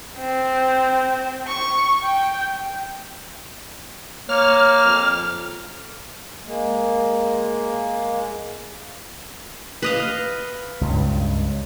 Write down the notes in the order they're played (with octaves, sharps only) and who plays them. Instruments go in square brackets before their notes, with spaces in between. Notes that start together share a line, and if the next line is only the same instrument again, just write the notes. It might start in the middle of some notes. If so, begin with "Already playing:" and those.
[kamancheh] C4
C#6
G5
[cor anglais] A#3 [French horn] C#5 [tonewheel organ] F6
[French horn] F2
[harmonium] G#3 A#3
[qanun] B4 D#5 F5
[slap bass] C#2 G2